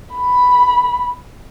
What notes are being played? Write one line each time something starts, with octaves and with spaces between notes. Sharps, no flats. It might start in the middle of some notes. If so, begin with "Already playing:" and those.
B5